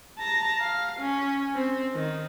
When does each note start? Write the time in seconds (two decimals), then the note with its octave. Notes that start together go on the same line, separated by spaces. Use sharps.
0.18 A5 A#5
0.61 F5
0.99 C#4
1.55 C4
1.95 D#3